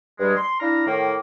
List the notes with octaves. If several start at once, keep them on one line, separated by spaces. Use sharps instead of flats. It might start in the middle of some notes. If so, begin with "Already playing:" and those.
G2 G3 G#3
C6
D4 E4 F5 A#5
A2 D#3 A#3